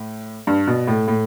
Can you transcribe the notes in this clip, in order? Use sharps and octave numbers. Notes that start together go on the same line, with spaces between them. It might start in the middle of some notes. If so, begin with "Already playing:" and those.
Already playing: A2
G2
B2
A2
A2